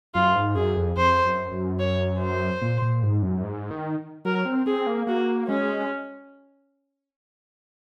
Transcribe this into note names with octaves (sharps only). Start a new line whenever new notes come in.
F#2 F4
G#2
F#2 G#4
F2
F2 C5
F#2
F#2
C#5
C5
A#2
A#2
G#2
F#2
G#2
D#3
F#3 A#4
C4
C4 G#4
A#3
A#3 F#4
G#3 C#4